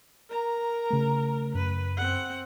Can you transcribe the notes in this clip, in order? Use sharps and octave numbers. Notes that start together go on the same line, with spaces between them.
A#4 A#5
C#3 A3
F#2 B4
C4 F#5